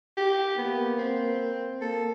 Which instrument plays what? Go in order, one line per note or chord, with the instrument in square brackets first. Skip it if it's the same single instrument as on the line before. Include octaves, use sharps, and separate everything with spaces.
[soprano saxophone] G4
[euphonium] A#3 [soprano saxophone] B3
[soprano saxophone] C4
[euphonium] A#3 [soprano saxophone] A4